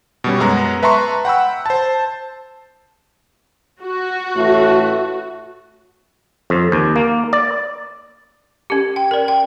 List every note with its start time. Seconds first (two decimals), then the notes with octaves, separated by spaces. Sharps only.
0.24 B2 G3 C#4
0.40 F#2 G#3 B3 A#5
0.83 B4 E5 A5 A#5 C6 C#6
1.25 F#5 G5 B5 E6
1.66 C5 A5
3.82 F#4
4.36 A1 A2 A3
6.50 F2
6.72 D#2
6.96 A#3
7.33 D5
8.70 C#4 G4
8.96 G5
9.11 A#4 D5
9.28 G5